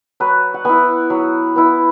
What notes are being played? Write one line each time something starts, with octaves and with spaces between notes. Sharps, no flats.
F#3 B4
F#5
B3 E4 G#5
F#3
B3 E4